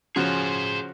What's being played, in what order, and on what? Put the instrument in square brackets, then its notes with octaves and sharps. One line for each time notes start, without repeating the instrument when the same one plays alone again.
[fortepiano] C#3 F3 F#4 [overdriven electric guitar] G#4 C5